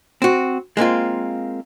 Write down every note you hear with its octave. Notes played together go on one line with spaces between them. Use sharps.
C4 F#4
G#3 A#3 C4 F4